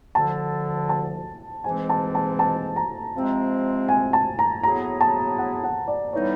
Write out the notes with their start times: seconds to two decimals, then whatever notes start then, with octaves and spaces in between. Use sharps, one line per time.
0.15 D2 D3 F3 A5
0.89 A5
1.64 G#2 E3 G#3 C4 G#5
1.89 A5
2.15 A5
2.39 A5
2.76 A#5
3.14 C3 F3 G#3 C4
3.89 G#5
4.13 A5
4.39 A#5
4.63 A2 F#3 B3 E4 G#4 A#5
5.01 A5
5.38 F#5
5.64 F#5
5.88 D5
6.13 A2 E3 G3 B3 D#4 C#5